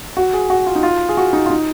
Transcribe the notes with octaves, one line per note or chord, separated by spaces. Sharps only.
F#4
G#4
F#4
F4
D#4
F4
G#4
F#4
D#4
F4
D#4